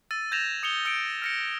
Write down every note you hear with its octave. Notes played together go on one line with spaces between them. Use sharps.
E6 A6 D#7
G6 G#6 A#6 E7 F7
D#6 C#7 F7 G7
E6 C#7 D7
F6 A#6 C#7